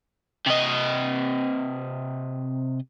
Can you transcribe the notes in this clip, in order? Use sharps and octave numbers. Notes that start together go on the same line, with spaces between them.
C3 D#5